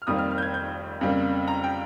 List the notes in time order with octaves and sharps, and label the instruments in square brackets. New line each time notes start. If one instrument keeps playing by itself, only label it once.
[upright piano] F6
F1 F2 D#3 G3 A#3 D#6
F6
F6
G6
G#6
G6
F2 C#3 G3 A#3
A#5
G5